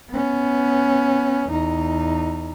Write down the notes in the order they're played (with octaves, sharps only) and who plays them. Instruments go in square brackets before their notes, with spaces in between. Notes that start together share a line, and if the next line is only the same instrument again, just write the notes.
[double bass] B3 C#4
E2 D#4